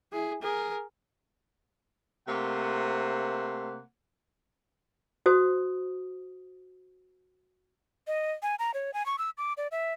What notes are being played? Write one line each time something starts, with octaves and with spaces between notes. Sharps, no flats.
E4 G#4
G#4 A#4
C3 A3 A#3 C5 F#5
F#4 C5 D#6
D#5
G#5
A#5
C#5
G#5
C#6
E6
D6
D5
E5